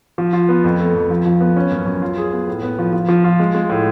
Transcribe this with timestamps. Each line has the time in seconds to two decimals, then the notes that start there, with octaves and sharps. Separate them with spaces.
0.18 F3
0.33 F4
0.49 B3
0.64 F2
0.79 A3
0.95 F2
1.10 F3
1.25 F3
1.41 B3
1.56 C#4
1.71 F#2
1.86 F#2
2.02 F4
2.18 G#4
2.32 B3
2.47 A2
2.63 B3
2.78 F3
2.93 F3
3.08 F3
3.24 F4
3.40 G#3
3.55 G#3
3.70 A2